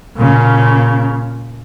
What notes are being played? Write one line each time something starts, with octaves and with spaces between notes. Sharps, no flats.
A#2 C#3